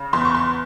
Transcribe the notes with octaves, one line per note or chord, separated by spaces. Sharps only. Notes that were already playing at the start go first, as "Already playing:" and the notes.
Already playing: C#3
E2 C6
C#6
C6